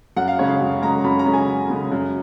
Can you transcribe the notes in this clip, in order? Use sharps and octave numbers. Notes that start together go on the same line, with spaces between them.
F#2 F#5
F5
C#3 G#3 C#4 C#5
F5
F#2
C#3 G#3 C#4 A#5
F#2 B5
A#5
C#3 G#3 C#4
G#5
F#2
C#3 G#3 C#4
F#2